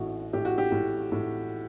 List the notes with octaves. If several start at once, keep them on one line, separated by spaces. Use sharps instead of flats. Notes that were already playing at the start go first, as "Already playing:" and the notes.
Already playing: A1 A2 E4 F#4
A2 G4
F#4
G4
A2
A2